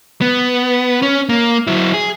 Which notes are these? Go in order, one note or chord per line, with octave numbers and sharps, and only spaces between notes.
B3
C#4
A#3
F#3 E4
G#4